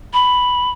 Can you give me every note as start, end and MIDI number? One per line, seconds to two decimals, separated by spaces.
0.13 0.70 83